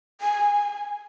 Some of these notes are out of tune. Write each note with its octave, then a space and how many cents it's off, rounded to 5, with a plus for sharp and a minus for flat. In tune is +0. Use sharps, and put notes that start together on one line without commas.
G#5 -15